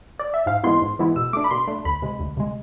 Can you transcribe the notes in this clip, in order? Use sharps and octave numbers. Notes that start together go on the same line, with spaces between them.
D5
E5
G#2 F5
E3 G#3 B3 E4 C6
G#2
E3 G#3 B3 E4
B2 E6
A3 D4 D6
B5
B2 C6
A3 D4
D2 B5
C3 G#3
D2
C3 G#3